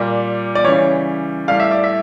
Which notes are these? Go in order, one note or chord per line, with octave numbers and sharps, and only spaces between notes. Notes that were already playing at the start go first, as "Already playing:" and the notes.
Already playing: A#2 G3
D5
C#3 E3 G3 C#5
A2 G3 F5
E5
D5
E5